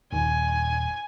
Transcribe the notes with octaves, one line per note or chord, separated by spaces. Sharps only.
D#1 G#5